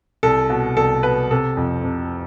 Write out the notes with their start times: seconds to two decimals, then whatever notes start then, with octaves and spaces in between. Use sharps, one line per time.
0.23 C2 A4
0.50 B2
0.77 C2 A4
1.03 B2 B4
1.31 C3 A4
1.57 F2
1.84 C3